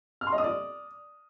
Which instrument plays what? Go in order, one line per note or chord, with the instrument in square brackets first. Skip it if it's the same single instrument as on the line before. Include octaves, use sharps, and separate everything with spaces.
[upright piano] F6
C6
D#5
D#6
D5